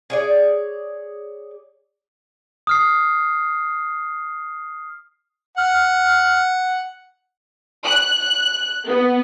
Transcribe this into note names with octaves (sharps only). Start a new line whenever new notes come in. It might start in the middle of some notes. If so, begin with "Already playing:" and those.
G#4 C#5 D5
D#6 F6 C7
F#5 F6
F#6
F#6
B3